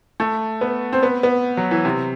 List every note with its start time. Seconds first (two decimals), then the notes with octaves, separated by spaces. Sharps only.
0.20 A3
0.61 B3
0.93 C4
1.03 B3
1.23 B3
1.57 F#3
1.71 E3
1.85 C3